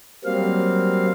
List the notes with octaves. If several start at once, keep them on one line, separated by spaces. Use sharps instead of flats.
F#3 G3 A#3 C4 F5